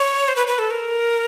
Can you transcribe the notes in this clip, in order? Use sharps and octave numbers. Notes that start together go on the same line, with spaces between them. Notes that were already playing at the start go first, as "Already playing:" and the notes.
Already playing: C#5
C5
B4
B4
A4
A#4